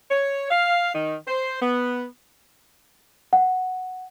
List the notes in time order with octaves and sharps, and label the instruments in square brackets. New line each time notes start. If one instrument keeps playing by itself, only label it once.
[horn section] C#5
F5
D#3
C5
B3
[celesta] F#5